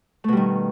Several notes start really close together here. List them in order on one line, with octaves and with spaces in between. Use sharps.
A3 B2 G3 D#3